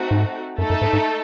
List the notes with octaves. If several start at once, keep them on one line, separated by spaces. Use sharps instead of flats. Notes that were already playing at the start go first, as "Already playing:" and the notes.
Already playing: A3 C4 D#4 F#4
G#2
F#2 A3 D#4 A4
F#2
G#2
G#2